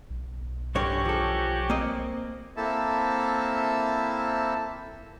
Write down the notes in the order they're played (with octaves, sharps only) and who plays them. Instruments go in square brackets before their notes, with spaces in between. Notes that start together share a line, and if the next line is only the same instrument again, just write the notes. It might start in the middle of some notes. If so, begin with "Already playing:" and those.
[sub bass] B1
[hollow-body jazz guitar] G2 D3 C#5 [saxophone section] C#4 F#4 G4
[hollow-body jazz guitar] F3 A4
A#3 C4 D#5
[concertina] A#3 C4 E4 A4 E5 A5